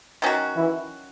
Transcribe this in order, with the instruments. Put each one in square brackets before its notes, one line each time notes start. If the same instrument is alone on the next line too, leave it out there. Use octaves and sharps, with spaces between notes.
[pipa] D#3 F#3 C#4 F#4
[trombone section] E3 E4